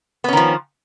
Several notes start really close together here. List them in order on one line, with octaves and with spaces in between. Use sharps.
B3 C#4 D#3 F3